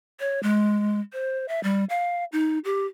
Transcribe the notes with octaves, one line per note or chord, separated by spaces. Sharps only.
C#5
G#3
C5
E5
G3
F5
D#4
G4